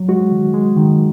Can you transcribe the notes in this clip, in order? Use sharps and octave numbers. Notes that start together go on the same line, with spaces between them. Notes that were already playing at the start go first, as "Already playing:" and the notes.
Already playing: F#3
G#3 F#4
D#3
G#3
D#3